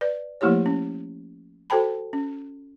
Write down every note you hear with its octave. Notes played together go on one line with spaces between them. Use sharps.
B4 D5
F3 A3 A#3 E4 G4 C#5
C#4
F#4 A4 C5 G5 A5 B5
C#4